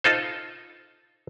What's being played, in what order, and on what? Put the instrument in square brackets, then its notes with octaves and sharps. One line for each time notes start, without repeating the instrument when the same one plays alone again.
[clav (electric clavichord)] D#4 F4 A4 C5